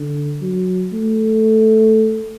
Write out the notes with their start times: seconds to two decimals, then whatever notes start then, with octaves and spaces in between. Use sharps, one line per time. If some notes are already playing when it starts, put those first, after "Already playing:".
Already playing: D3
0.41 F#3
0.93 A3